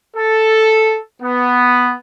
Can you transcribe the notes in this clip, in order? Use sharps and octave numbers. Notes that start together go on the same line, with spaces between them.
A4
B3